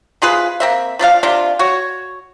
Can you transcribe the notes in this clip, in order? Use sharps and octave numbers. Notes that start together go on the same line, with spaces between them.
C3 F4 G#4 B4
A#3 C4 E5
F3 D4 A4 F5
C3 D4 F4
F#4 C#5